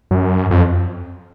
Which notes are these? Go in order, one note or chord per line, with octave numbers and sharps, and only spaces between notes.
F#2
F2